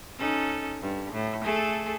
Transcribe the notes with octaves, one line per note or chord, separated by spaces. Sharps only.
C#4 D#4 A4
G2
A2
A3 G#4 A4